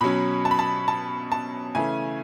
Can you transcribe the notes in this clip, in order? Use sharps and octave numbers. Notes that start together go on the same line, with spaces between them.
B2 F#3 C#4 B5
A5
B5
A5
A5
A5
C#3 E3 A3 C#4 G#5